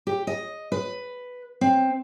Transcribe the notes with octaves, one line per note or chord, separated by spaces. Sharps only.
G4
D#5
B4
C4